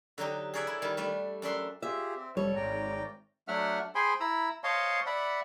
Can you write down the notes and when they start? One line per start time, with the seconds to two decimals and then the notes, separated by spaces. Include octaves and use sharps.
0.18 D3 F#3 D#4 G4
0.54 G#4 A#4 C#5 D5 E5 F#5
0.67 E4
0.82 D#3 G3
0.97 G3 A3 D4
1.42 F#2 D4 E5 C6
1.82 F4 G4 G#4 E5
2.16 C4
2.37 F1 G3 A4 C#5
2.56 G#1 G#2 D5 G5 A#5
3.48 F#3 A3 D4 E5 F#5 F6
3.95 G#4 C5 G5 G#5 B5 C6
4.20 E4 A#5 B5 E6
4.64 C5 C#5 D#5 F5 A5 C6
5.06 D5 E5 F#5 B5